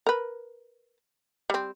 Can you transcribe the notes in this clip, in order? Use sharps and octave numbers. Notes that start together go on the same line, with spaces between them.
A#4 B4
G3 C4